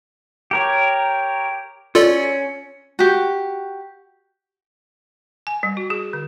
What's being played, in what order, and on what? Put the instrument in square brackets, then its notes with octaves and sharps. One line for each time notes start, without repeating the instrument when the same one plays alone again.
[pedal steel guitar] G4 A#4 C#5
[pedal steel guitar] C#4 [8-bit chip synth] F4 A4 D5
[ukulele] F#4 G4
[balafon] G#5
G3
F#4
G#4
D3